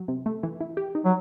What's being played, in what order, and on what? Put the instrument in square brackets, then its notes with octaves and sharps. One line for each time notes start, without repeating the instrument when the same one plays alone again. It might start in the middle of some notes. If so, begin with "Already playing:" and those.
Already playing: [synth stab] F#3
C3
A3
E3
E4
G4
D#4
[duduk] F#3